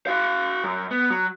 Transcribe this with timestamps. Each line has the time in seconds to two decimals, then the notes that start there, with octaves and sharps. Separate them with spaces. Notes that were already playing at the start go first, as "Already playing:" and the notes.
0.07 F#4 F5
0.64 F#2
0.91 B3
1.10 F#3